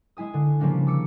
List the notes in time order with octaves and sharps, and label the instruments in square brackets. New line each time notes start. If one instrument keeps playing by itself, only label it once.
[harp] G#3 E4 G#5 D#6
D3
C#3 F3 G3 A#3 C#4 D4
D6 E6 C#7